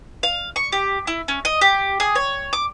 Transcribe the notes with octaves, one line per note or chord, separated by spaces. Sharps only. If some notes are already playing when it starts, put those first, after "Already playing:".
F5
C#6
G4
E4
C#4
D#5
G4
G#4
C#5
D6